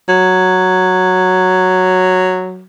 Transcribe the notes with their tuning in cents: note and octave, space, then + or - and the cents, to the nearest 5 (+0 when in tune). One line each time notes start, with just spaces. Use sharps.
F#3 +0